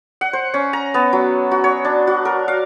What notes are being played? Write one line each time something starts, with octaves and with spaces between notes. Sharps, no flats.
F#5
C5
C#4
A#5
B3
F#3
F#4
C#5
D4
F#4
A#4
F5